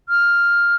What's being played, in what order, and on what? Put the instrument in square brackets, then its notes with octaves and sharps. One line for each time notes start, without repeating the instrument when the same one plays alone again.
[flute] F6